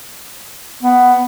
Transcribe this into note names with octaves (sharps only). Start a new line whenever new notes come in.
B3